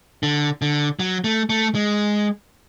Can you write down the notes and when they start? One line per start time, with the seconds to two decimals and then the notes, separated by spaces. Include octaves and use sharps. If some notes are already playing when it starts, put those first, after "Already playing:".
0.23 D3
0.62 D3
0.99 F#3
1.24 A3
1.50 A3
1.75 G#3